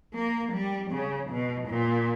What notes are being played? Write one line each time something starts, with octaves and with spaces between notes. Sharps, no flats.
A#3
G3
C#3
B2
A#2